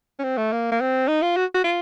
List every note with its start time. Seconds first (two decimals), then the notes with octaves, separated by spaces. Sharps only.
0.19 C#4
0.23 C4
0.37 A3
0.52 A#3
0.72 A#3
0.81 C4
1.08 D#4
1.22 F4
1.36 F#4
1.54 F#4
1.64 F4